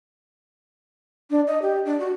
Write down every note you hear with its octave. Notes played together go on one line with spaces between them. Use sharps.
D4
D#5
G4
D4
F#4